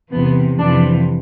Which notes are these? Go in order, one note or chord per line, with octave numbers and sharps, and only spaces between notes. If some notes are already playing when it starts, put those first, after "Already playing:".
E2 C3 E3 B3
F2 C3 E3 D4